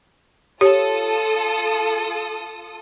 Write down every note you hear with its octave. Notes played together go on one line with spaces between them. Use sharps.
F4 G4 A4 C#5 D#6